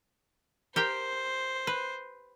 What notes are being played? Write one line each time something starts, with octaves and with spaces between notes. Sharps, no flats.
G4 A#4 C5 G5
B4